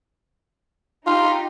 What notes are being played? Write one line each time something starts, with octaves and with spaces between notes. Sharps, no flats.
D#4 F4 G4